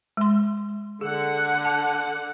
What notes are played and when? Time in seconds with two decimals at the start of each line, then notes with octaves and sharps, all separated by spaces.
0.17 G#3 C6
1.01 D3 G#4 F#5
1.65 A5